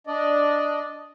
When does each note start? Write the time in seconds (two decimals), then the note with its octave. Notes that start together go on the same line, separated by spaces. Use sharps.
0.07 D4 D5 D#5